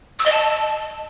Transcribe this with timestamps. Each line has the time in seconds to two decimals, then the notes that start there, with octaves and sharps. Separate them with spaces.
0.19 E6
0.26 D#5
0.32 A5